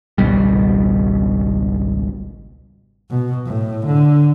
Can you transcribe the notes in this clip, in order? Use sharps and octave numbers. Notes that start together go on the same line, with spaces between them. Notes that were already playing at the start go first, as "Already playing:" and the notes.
G#1 C#2 B2 G3
B2
A2
D3